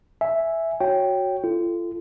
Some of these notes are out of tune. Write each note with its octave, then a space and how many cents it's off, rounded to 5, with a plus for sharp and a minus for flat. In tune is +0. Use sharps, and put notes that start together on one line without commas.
E5 +0 G#5 +0
F#4 +0 C#5 +0 G5 +0
F4 -30 A4 -5